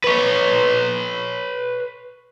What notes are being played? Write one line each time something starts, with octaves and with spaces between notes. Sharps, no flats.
B4 C#5